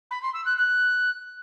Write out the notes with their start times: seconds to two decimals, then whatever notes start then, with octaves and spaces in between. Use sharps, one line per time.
0.11 B5
0.22 C6
0.34 E6
0.45 F#6
0.57 F#6